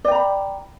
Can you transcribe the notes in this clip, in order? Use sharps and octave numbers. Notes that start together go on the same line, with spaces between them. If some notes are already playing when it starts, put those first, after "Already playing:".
D5 G5 A#5 B5